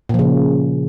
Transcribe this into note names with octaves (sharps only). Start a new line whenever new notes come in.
A#2 C#3 F3